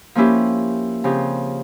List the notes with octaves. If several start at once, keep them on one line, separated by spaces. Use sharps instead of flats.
F3 A#3 C#4 E4 G4
C#3 F3 C4 G4